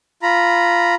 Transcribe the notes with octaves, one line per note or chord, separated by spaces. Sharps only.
F4 A#5 B5